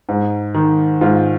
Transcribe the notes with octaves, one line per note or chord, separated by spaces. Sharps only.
G#2
D#3
G#2 F4